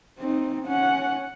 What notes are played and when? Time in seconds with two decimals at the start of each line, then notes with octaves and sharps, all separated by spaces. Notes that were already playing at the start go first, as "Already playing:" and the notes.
0.19 C4 D#4
0.66 C#4 F#5